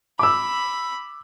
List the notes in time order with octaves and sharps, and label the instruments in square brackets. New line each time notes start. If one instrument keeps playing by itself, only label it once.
[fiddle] B5 [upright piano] D6 E6